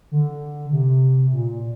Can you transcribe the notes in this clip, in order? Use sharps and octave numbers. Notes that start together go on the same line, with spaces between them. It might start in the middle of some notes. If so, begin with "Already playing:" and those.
D3
C3
A#2